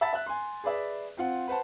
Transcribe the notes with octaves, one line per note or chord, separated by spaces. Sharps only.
E5 F#5 A5 B5 A6
E5 F#6
G#5 C6
G#4 B4 D5 E5
C4 F4 F#5
B4 C5 F#5 A5